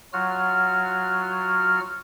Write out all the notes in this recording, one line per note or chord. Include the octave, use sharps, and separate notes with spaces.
F#3 F4 F#4 F6